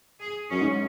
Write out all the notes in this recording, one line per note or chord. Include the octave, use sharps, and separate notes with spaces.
G#4
F#2 C#4
G#2